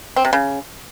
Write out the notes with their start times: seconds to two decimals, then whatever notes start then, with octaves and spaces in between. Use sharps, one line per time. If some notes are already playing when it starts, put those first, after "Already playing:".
0.16 C4
0.25 C3
0.33 C#3